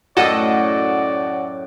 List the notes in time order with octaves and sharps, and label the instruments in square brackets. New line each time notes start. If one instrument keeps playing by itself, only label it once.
[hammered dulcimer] F#2 A2 [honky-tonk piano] F#4 [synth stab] A4 D#5 [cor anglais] D5